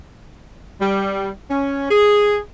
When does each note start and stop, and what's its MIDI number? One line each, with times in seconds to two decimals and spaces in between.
0.81 1.29 55
1.51 1.87 61
1.91 2.38 68